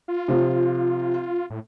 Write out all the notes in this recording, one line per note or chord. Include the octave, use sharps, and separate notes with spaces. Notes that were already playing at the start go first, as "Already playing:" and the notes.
F4
C3 F3
A2